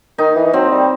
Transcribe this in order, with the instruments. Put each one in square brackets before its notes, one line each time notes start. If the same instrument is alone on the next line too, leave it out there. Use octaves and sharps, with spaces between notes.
[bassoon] D#3 [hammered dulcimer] D#4
[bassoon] E3
E3
[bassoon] F#3 [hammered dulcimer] C4
[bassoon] G3